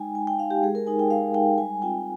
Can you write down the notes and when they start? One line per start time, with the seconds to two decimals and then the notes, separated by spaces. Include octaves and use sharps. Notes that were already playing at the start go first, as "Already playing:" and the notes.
Already playing: G#3 D#4 G5 G#5
0.15 G#3 G#5
0.27 G5
0.39 D#4 F5
0.51 G4
0.63 G#3 G#4
0.75 A#4
0.87 D#4 G#5
0.99 G5
1.11 G#3 F5
1.34 D#4 G5
1.58 G3 G#5
1.82 C4 F4 G5